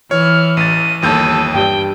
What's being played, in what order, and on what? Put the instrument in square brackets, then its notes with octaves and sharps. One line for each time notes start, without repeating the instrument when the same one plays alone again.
[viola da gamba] E3 [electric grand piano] C#5 [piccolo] F6
[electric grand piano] A1 A6 [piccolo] D#7
[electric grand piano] G1 D#2 G6 [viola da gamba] A4
[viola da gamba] G2 [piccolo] G5